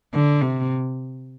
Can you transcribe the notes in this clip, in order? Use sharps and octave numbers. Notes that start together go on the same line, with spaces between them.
D3
C3